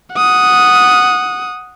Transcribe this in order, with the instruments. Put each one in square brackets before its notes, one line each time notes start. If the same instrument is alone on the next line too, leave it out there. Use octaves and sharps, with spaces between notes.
[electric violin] F#5 D#6